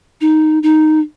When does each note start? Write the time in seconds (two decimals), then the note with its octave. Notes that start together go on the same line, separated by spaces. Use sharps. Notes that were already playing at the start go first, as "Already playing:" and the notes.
0.21 D#4
0.63 D#4